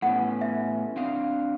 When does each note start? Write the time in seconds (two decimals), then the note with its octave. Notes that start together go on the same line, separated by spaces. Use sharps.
0.02 A2 B3 C#4 F#5
0.41 E5
0.97 C4 D4 F5